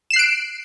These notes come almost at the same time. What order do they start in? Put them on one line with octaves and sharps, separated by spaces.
E7 C7 F#6 D7